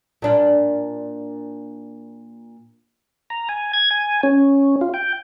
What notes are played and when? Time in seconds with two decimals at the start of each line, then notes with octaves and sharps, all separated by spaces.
0.22 A#2 D4 F4
3.30 A#5
3.49 G#5
3.73 G#6
3.91 G#5
4.23 C#4
4.81 F4
4.94 G5